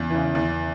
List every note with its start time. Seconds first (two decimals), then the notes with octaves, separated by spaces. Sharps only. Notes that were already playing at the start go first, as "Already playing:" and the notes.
Already playing: E2 C#3 E3
0.10 C#3 E3
0.35 E2